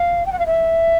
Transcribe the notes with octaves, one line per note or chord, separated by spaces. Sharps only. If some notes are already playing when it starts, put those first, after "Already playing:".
Already playing: F5
G5
F#5
F5
E5